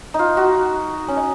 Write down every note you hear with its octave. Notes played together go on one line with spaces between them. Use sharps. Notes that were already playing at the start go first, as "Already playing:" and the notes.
D#4 F4
F#4
C#4
D#4